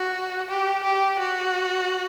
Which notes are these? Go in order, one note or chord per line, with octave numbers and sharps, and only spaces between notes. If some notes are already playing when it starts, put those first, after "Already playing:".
Already playing: F#4
G4
G4
F#4